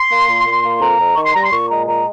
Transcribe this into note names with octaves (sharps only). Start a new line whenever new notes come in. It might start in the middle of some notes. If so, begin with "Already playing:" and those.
Already playing: C6
A#3
A#2
A#2
A#3
F2 A#5
F2
D#3 C#6
C6
G3 A#5
C6
A#2 C#6
G#3 A#5
A#2 A#5